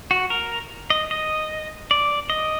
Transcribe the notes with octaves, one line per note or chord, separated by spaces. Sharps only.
F#4
A#4
D#5
D#5
D5
D#5